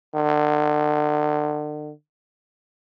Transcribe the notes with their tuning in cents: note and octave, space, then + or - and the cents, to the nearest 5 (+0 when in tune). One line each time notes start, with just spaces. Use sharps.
D3 +35